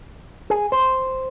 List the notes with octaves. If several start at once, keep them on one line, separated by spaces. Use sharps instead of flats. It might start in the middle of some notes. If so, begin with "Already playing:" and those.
G#4
C5